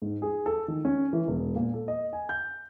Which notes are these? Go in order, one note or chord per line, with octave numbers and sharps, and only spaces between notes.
G#2
G#4
A4
D#3
C#4
E3
E1
A#2
A4
D#5
G#5
G6